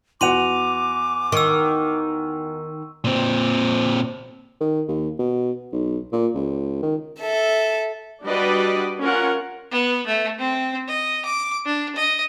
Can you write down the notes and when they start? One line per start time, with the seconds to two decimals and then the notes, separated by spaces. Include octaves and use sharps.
0.21 E2 F#4 C6 D6 D#7 F7
1.32 D#3 C#6 E6
3.04 A#2 C4
4.60 D#3
4.88 D#2
5.19 B2
5.72 B1
6.12 A#2
6.35 C#2
6.83 D#3
7.20 A4 E5
8.25 G3 D4 F#4 B4 D5 D#5
9.00 C#4 F4 A#4 F#5
9.72 B3
10.07 A3
10.39 C4
10.88 D#5
11.25 D6
11.66 D4
11.96 D#5